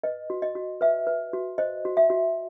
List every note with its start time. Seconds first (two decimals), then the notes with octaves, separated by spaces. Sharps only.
0.04 B4 D#5
0.30 F#4
0.42 D#5
0.55 F#4
0.81 B4 E5
1.07 B4
1.33 F#4
1.58 C5 D#5
1.85 F#4
1.97 E5
2.10 F#4